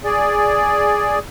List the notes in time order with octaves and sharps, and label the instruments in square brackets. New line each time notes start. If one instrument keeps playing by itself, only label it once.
[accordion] G#4 D5